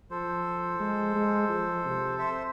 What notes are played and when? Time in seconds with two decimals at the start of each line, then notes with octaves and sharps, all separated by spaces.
0.11 F3 A4 C5
0.80 G#3
1.15 G#3
1.49 F3
1.84 C3
2.19 C5 E5